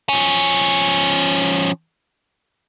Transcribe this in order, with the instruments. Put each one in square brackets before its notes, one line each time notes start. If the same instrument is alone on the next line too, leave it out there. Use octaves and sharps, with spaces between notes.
[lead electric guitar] F3 C#4